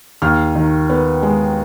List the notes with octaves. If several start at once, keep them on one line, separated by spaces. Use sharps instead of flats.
D#2 F6
D#3
B3
G#3